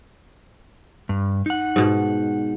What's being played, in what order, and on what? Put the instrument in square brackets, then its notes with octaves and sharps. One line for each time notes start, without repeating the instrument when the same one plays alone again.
[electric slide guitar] G2
D#4 F#5
[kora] G#2 B2